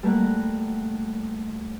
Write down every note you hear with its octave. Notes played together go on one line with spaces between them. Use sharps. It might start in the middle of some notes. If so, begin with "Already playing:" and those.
G3 A3 A#3 A#4 F#5